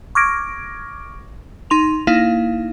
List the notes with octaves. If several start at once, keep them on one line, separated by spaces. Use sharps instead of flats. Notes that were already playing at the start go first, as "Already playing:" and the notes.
C#6 D6 F6 G#6 A#6 D7
D#4 C6 F7
A#3 D#4 E4 F5